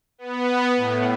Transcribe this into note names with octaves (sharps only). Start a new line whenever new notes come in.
B3
A2